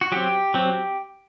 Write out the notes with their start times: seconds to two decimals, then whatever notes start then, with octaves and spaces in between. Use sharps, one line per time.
0.01 F#4
0.12 F#3 C4 G4
0.54 F#3 C4